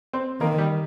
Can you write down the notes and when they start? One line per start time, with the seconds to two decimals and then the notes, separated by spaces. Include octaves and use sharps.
0.13 C4 C5
0.41 D#3 A#3 A#4
0.58 G3 G4